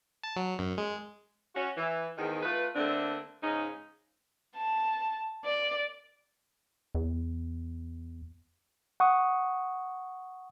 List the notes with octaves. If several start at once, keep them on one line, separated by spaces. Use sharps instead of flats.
A5
F#3
F#2
G#3
C#4 F#4
E3
E2 G#2 D#3
A3 F4 B4
D3 A3 A#3 C4 D4
G#2 C#3 C#4 D#4
A5
D5
E2
F#5 C#6 D#6